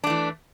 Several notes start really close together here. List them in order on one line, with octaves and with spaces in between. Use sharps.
D4 A3 E3